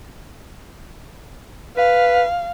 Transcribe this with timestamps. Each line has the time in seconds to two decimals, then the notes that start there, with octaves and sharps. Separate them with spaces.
1.77 B4 F5